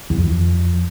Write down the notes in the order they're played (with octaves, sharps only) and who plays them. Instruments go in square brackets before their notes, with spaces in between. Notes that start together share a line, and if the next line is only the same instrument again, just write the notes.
[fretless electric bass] E2
F2